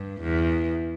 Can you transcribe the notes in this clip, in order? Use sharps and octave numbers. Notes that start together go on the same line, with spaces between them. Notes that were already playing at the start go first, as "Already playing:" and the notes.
Already playing: G2
E2